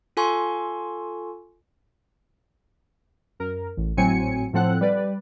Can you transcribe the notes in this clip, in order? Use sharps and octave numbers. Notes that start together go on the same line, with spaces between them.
F4 A4 G#5 C6 C#6
F#2 A#4
A1
G#1 A2 F#3 C4 G#5 C#7
A2 F3 C4 A4 F#5 F#6
G3 B4 D5